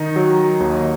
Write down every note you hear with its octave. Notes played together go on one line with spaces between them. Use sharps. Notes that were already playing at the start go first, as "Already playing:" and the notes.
Already playing: D#3 D#4
F#3
D#2